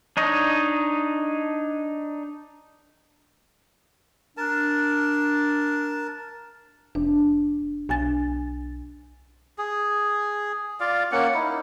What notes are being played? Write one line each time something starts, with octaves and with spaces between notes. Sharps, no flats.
D4 D#4 C#5 D#5
D4 A#4 A5
F1 D4
B1 D4 G#5 A6
G#4
F4 D5 F5
A#3 C#4 F#5
D#4 E4